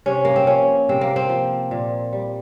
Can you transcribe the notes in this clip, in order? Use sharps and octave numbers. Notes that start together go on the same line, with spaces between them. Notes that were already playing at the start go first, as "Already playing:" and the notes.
C3 C#4
A#3
C4
F3 C#4
C3 C4
A#3
C4
F3
A#2
G3